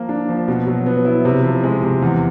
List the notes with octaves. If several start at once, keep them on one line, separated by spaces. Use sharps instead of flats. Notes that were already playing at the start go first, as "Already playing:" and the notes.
Already playing: F3 A#3
D4
F3
B2
F#3
B3
E4
C3
F3
G#3
C3
E2